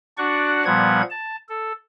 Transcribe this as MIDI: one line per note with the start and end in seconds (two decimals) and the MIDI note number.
0.18 0.65 62
0.18 0.65 66
0.18 0.65 74
0.18 0.65 78
0.18 0.65 85
0.65 1.02 46
0.65 1.02 53
0.65 1.02 55
0.65 1.02 59
0.65 1.02 78
0.65 1.02 92
1.10 1.36 81
1.49 1.72 69